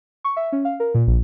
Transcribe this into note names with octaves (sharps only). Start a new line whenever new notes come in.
C#6
E5
C#4
F5
A#4
A#2
A#1